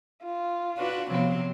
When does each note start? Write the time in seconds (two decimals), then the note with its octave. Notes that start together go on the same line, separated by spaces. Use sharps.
0.24 F4
0.77 D4 F#4 B4
1.10 C3 F3 F#3 B3 C4